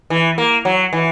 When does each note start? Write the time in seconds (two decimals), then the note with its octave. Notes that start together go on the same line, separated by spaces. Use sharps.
0.10 E3
0.38 A#3
0.65 F#3
0.93 E3